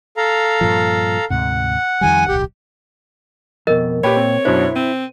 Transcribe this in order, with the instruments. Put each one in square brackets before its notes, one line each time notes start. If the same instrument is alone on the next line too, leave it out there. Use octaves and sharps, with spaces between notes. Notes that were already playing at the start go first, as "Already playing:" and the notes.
[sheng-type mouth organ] A4 F5 A#5
[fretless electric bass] G2 A#2 F3
[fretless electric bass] D2 G#2 C3 [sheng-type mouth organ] F#5
[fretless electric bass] F2 D#3 G3 [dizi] G#5
[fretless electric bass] D1 B1 [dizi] G4
[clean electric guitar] F2 B2 [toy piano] A#4 D#5
[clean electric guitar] A#2 G5 [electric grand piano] G4 B4 B5 [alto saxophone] C#5
[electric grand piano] C4
[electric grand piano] F#2 B2 D4 [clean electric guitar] E4 [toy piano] C5
[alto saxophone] C4 [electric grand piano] D#7